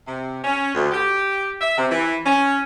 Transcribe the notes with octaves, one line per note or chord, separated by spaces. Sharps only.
C3
C#4
D2
G4
E5
C3
E3
C#4